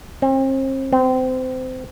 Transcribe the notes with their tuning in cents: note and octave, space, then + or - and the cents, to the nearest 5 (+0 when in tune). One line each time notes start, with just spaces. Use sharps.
C4 +40
C4 -25